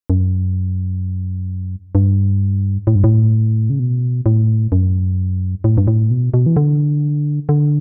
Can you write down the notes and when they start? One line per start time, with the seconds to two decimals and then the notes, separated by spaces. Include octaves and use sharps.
0.10 F#2
1.95 G2
2.87 A2
2.95 G2
3.04 A2
3.70 C#3
3.79 B2
4.26 A2
4.72 F#2
5.64 A2
5.78 G2
5.87 A2
6.10 B2
6.34 B2
6.46 E3
6.56 D3
7.49 D3